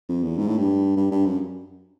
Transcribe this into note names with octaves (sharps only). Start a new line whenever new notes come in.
F2
E2
G#2
A2
G2
G2
G2
F#2